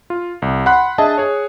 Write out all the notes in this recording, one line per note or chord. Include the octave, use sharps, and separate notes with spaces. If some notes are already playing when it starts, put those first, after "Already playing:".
F4
C2
F#5 B5 C6 F#6
D4 G#4 D#5 E5 A5
G#4 C#5